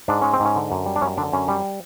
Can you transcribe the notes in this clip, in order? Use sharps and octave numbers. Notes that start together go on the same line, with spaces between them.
G#2 D4
G#3 C#4
C4
G#2
C#4
D3
F#2
G3
D4
F#2 C#4
D3 D4
F#2 C#4
G3